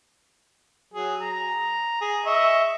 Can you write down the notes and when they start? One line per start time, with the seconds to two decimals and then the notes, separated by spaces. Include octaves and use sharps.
0.94 F#3 G#4
1.21 A#5
2.01 G#4
2.26 D#5 E5 C#6